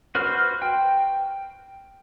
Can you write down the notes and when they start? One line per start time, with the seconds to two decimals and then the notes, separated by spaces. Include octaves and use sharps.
0.15 F#4 B4 C5 F6
0.62 G5